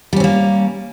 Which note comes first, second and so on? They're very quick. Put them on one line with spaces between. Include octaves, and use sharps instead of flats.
G3 C#4 C4 A#3